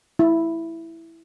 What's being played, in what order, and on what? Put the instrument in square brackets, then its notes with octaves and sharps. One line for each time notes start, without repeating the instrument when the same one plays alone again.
[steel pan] E4